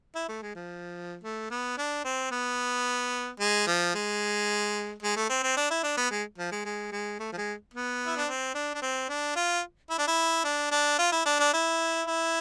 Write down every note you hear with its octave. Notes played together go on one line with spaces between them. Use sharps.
E4
A3
G#3
F3
A3
B3
D4
C4
B3
G#3
F3
G#3
G#3
A3
C4
C4
D4
E4
D4
B3
G#3
F3
G#3
G#3
G#3
A3
F3
G#3
B3
E4
D4
C4
D4
D4
C4
D4
F4
E4
D4
E4
D4
D4
F4
E4
D4
D4
E4
E4